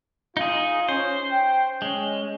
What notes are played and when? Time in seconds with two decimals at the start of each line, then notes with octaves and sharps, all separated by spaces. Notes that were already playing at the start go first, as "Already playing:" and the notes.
0.37 D#4 F4 G#4
0.89 C#4 C5
1.31 G5
1.82 G#3 C#4